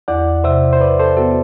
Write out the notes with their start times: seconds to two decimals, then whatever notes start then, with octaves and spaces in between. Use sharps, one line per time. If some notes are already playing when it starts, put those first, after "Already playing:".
0.08 E2 D5 F#5
0.44 C3 C5 E5
0.73 C5
0.81 C3 B4 D5
0.99 A4 C5
1.17 B3 F#4 A4